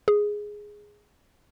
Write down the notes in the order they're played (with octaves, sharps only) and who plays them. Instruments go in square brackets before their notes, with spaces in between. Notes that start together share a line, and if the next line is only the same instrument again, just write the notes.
[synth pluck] G#4